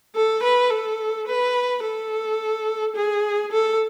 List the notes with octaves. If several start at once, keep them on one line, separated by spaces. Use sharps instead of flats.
A4
B4
A4
B4
A4
G#4
A4